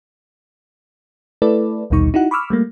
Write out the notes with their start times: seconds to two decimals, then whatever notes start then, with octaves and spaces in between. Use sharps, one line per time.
1.42 A3 E4 A4 B4 D5
1.90 A#1 D#2 B2 G3 D#4 C#6
2.14 D#4 E4 F#4 F#5
2.31 B5 C#6 D6 E6 F6
2.50 G3 A3 A#3